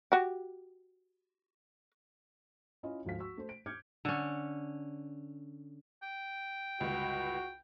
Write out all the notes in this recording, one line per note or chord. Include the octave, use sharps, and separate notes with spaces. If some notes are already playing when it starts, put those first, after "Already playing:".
F#4 G4
C#4 E4 F4 D#5
G#1 D2 F3 A3 F5 B6
F#4 C#6 E6
A3 C5
D7
D6 F6 G6 G#6 C#7
D3 C#4
G5
G1 C#2 F#4